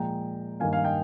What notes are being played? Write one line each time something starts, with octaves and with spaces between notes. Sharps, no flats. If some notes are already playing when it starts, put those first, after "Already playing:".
Already playing: A#2 F3 G#3 G5 A#5
G2 D#3 A#3 F5 G#5
F5 G#5
D#5 G5